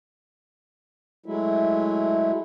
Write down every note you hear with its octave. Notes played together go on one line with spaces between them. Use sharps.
F#3 G#3 A3 E4